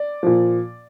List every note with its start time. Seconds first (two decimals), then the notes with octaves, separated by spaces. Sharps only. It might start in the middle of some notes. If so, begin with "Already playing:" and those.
Already playing: D5
0.23 A#2 F3